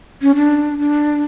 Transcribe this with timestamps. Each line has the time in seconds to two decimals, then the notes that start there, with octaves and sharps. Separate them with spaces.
0.22 C#4
0.36 D4
0.79 D4